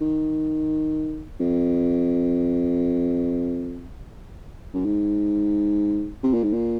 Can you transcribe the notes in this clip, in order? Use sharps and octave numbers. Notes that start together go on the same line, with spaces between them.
D#3
F2
F#2
G#2
C3
A#2
G#2
A#2